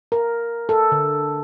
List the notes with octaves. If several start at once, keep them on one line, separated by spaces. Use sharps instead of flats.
A#4
A4
D3